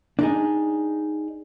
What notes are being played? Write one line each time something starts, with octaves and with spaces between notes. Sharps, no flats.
D4 D#4 G#4